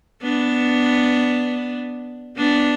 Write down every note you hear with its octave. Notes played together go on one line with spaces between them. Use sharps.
B3 D4
B3 D4